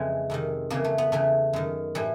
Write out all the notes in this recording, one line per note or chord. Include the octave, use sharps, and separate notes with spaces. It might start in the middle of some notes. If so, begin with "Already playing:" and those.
Already playing: F2 C#3 E3 G#3
F2 C3 D#3
F2 C#3 E3 A#3
A3
B3
E2 C#3 E3 A3
F#2 D#3
A2 E3 G3